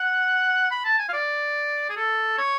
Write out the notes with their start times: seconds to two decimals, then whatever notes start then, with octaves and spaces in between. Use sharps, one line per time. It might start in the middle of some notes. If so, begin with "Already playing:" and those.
Already playing: F#5
0.71 B5
0.85 A5
0.99 G#5
1.09 F5
1.13 D5
1.90 G#4
1.97 A4
2.38 C#5